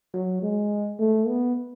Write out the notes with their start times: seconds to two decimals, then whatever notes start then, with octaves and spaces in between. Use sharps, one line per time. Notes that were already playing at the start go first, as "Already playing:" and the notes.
0.14 F#3
0.42 G#3
0.99 A3
1.28 B3